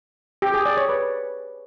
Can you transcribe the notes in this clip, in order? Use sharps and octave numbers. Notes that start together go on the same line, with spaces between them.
G4
G#4
D5
C#5
B4